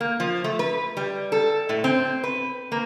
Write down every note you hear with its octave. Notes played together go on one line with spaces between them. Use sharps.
A#3
F3
A3
B4
G3
A4
A2
C4
B4
A#3